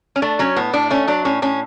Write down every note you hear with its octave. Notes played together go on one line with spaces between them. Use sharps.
C#4
A3 D4
F#3 C#4
A2 B3
A2 D4
A3 C#4
F#3 D4
A2 C#4
A2 C#4